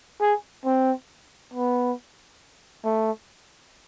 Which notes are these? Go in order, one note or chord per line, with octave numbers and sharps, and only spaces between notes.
G#4
C4
B3
A3